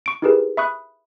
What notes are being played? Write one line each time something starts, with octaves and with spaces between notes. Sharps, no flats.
C#6 D7
D#4 E4 G4 G#4 A#4 B4
E5 B5 C#6 D#6 F#6